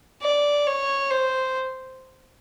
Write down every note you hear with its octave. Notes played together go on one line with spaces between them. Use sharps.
D5
C#5
C5